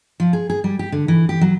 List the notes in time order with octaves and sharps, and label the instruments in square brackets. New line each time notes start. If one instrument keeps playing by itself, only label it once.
[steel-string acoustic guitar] F3
G#4
G#4
G3
G4
D3
E3
G4
F#3